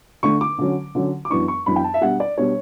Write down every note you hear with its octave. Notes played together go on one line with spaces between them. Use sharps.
D3 A3 D4 C#6
D6
D3 F#3 C#4
D3 F#3 C#4
D6
F#2 E3 B3 D4 C#6
C#6
F#2 E3 B3 D4 B5
G5
A5
E5
B2 G3 D4 F#5
D5
B2 G3 D4 C#5